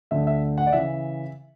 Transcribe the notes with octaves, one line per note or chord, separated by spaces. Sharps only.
D2 D3 E5
E5
F#5
D5
C#3 E3 E5